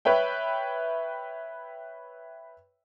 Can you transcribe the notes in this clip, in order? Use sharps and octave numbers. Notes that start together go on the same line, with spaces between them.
B4 C#5 E5 G5